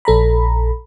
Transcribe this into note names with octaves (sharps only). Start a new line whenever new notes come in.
A#1 A4 A#5 B5